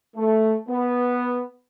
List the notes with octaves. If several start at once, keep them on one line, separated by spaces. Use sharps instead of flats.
A3
B3